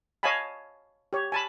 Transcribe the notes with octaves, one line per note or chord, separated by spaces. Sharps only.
C#5 D#5 F5 G#5 A5 B5
G4 C#5
G#5 A5 B5